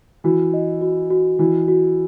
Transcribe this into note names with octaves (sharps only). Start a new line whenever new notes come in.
E3 F#4
D#5
F#4
F#4
E3 F#4
F#4